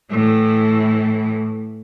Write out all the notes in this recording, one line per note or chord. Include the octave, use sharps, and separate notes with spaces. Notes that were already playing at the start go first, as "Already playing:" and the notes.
A2 E3